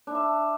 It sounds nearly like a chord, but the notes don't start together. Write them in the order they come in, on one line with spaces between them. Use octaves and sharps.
D4 E4 E5